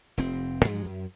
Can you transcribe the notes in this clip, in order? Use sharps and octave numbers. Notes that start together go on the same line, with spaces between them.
F1 C4
G2 F3 F#3 G#3
F#2